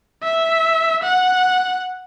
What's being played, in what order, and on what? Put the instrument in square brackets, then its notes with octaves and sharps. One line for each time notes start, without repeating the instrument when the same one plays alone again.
[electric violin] E5
F#5